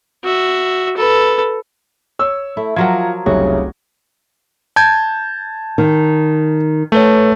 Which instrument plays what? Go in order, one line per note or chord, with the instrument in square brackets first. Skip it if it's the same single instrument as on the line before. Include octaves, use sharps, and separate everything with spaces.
[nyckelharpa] F#4 E5
A4 B4
[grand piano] C#5 E6
[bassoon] A3 [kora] E4
[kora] F3 F#3 A#4 [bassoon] F4 [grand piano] F#5 G#6
[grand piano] F1 C2 F#3 [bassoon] C#3 [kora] F#4
[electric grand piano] A5 G6 G#6
[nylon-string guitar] D#3
[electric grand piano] A3 [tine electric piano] A4 B4 C#5